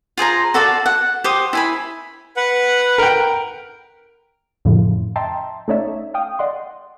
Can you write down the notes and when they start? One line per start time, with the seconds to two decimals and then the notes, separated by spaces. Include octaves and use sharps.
0.17 F4 G#4 C5 A#5
0.54 F#4 A4 D5 F5
0.86 F#5
1.24 G4 C5 D#6
1.53 E4 G#5 B5
2.37 B4 F#5
2.98 A#4 G5
4.65 F2 A2 C#3 F3
5.16 D#5 E5 G5 A5 A#5 C6
5.68 A3 C#4 D#4 C#5 D5 E5
6.14 F5 G5 D#6
6.39 D5 D#5 F#5 C6